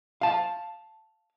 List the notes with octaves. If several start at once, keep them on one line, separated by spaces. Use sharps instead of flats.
F5 A5